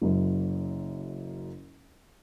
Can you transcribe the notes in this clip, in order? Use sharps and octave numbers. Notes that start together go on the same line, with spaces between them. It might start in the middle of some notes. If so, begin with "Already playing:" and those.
F#1 F#2